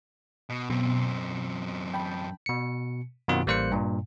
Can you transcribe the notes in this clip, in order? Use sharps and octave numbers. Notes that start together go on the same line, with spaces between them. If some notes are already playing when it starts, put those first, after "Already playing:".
B2
F#2 B2 C4
G5 A5 B5
B2 C#7
F#2 B2 D#3 C4 F4 F#5
A1 G3 A#3 C5 F#6 C#7
G2 A#2